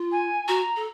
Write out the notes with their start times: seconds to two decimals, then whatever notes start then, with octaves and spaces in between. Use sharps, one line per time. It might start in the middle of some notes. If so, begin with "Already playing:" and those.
Already playing: F4
0.12 G#5
0.48 F#4 A#5
0.76 A4